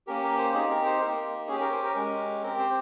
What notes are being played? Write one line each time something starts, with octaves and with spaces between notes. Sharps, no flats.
A#3 C#4 G4 A#4
A#4
C5
C4 D#4 G4 G#4
A#4
C5
A#3 D#4 G4 A#4
C#4 G4 G#4
A#4
C5
A#4
G#3 C#4 G4
C4 G4 A#4
C5